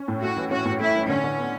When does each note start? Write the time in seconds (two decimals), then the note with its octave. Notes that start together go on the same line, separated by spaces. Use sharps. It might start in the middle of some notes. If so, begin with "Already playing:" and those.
Already playing: C#4
0.08 A2
0.22 A3 F#4
0.37 E3
0.51 C#4 F#4
0.65 A2
0.79 A3 E4
0.94 E3
1.09 D3 C#4
1.23 D3
1.38 B3